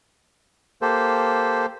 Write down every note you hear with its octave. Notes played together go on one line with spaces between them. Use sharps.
A#3 G4 A4 C5